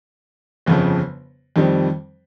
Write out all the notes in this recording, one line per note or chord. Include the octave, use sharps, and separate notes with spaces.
G1 F2 C#3 F3
F2 D#3 G3 C4